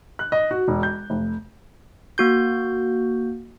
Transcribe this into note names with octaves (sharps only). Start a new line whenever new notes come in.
F#6
D#5
F#4
E1
G6
F1
A#3 F#4 G6